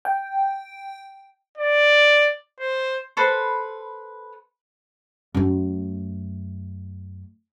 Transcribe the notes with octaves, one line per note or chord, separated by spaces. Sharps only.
G5
D5
C5
A4 B4 C5 B5
F#2 A3